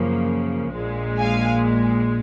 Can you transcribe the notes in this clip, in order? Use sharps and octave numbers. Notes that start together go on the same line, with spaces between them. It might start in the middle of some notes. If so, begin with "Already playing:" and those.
Already playing: F#2 C#3 F3 A#3
A#1 A#2 G#3
F5 G#5